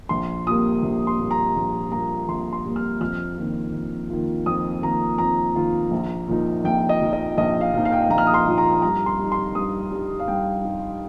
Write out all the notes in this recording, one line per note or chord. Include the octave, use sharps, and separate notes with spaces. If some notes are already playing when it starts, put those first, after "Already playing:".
A#1 C6
A#2 G3 A#3 D#6
A#1
C6
A#2 G3 A#3
A#5
A#1
A#2 G3 A#3 A#5
A#1 C6
C6
A#2 G3 A#3
F6
F2 F6
D#3 A#3 F4
F2
D#3 A#3 F4
F2 D#6
D#3 A#3 F4 A#5
F2 A#5
D#3 A#3 F4
A#1
A#2 F3 D#4
A#1 G5
D#5
A#2 F3 D#4
D#5
A#1 D#5
F5
A#2 F3 D#4
F5
G5
F5
A#1 A#5
F6
D#6
C6
A#2 F3 D#4
A#5
G2 A#5
C6
G3
D#4
C6
G2 D#6
G3 D#4
F5
G2 G5
G3 D#4